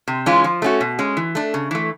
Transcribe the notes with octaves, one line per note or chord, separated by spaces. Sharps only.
C3
E3 G#3 C#4 F4
F3
A3 C#4 F#4
B2
G#3 C#4
E3
A3 D4
C#3
E3 A3